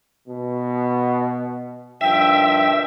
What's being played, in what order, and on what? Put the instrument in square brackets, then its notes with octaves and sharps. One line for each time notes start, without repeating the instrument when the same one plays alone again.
[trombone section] B2
[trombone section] G2 D#3 F3 [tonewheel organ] E5 [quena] G5